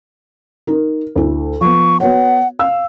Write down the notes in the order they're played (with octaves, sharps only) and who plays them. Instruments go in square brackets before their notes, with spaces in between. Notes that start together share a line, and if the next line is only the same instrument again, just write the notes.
[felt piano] D#4 A#4
D2 E4
[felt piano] F3 B3 [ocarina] C#6
[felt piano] B3 F#4 C#5 [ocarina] F#5
[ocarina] F5 [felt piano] E6